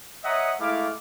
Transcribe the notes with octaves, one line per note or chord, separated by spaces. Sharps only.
C#5 D#5 E5 F#5 A#5 D#6
G#3 A3 E4 F5 D6